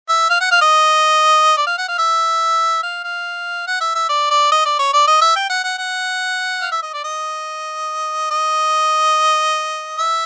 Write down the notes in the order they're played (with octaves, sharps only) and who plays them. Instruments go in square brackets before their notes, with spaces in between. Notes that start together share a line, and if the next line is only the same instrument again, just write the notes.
[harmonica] E5
F5
F#5
F5
D#5
D5
F5
F#5
F5
E5
F5
F5
F#5
E5
E5
D5
D5
D#5
D5
C#5
D5
D#5
E5
G5
F#5
F#5
F#5
F5
E5
D#5
D5
D#5
D#5
E5